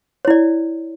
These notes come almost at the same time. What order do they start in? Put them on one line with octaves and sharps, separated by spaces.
C#5 E4 D5